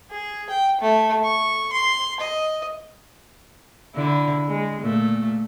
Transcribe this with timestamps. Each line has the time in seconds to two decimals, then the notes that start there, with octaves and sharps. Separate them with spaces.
0.11 G#4
0.50 G5
0.81 A3
1.24 C#6
1.73 C6
2.21 D#5
3.95 D3 E4
4.47 G#3
4.82 A#2 A3